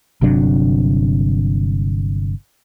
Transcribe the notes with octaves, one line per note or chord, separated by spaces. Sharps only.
G1 C3 F#3 D4